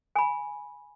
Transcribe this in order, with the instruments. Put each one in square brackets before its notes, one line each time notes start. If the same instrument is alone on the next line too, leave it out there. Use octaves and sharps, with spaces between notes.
[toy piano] G#5 B5